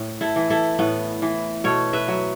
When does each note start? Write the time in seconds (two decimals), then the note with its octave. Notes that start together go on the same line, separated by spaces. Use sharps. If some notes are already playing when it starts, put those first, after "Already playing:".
Already playing: A2
0.21 E4 A4
0.36 E3
0.50 E4 A4
0.79 A2 B3
1.22 E3
1.64 B2 A4 C#5
1.93 B4 E5
2.08 F#3